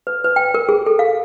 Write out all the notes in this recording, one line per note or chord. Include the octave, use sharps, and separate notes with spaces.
B4
B4
G5
A#4
G#4
A4
F5